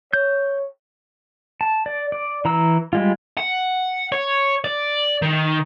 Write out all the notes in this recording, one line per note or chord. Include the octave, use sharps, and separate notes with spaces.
C#5 G6
A5
D5
D5
E3 A#5 E6
G3 G#3 F4
F#5
C#5
D5
D#3